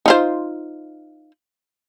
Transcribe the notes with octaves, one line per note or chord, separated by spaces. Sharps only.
D#4 F4 C5